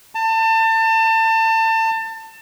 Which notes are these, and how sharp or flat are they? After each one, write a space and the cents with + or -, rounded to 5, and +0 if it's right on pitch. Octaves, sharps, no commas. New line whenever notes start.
A5 +30